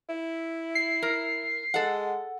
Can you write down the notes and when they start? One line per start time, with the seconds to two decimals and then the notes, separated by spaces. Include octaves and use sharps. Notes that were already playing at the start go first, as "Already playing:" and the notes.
0.09 E4
0.75 C7
1.03 A#4
1.74 G#3 A4 F#5